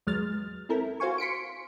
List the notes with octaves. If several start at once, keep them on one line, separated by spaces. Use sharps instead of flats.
E2 F#3 G#3 F6 A6
C4 E4 A4 A#4
F#4 C5 F5 G#5 C#6
C6 B6 C#7 D7